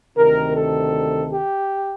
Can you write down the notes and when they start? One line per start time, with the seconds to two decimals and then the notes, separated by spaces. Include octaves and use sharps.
0.16 D2 C3 D#3 A#4
0.55 A4
1.31 G4